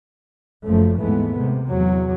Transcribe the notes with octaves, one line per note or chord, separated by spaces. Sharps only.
F#1 F#2 F3 A3
D#2 G#2 E3 G#3 A3 B3
C3
E2 F#3